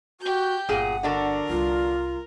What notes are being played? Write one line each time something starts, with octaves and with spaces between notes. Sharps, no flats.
F#4 G4 G6
G1 A#2 G#4 F#5
D3 D4 F#4 A#4
C2 G3 F4